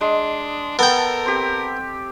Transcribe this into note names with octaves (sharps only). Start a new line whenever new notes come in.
G#3 D4
B3 A4 A#4 G5
C4 G4